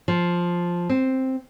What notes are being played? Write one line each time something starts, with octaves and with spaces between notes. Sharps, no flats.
F3
C4